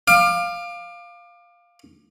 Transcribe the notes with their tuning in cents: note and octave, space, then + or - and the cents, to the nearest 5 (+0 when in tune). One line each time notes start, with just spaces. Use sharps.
F5 +0 D6 +30